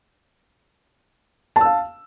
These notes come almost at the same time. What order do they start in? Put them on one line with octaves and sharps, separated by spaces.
A5 E6 F5